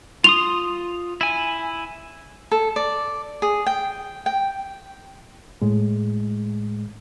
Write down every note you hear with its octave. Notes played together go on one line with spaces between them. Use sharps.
F4 C6 D#6 F7
E4 G#5
A4
D5
G#4
G5
G5
A2 G#3